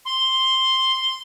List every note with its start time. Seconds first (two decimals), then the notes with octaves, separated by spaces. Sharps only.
0.05 C6